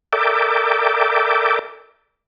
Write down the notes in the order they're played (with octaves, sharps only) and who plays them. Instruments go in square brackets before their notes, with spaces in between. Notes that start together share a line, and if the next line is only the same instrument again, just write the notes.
[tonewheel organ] A4 A#4 D5 E5 G5 D6